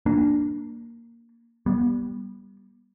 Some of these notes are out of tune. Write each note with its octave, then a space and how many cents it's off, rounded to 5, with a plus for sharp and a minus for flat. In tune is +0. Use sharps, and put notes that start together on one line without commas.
A#3 +0 D4 +0
G3 +0 B3 -30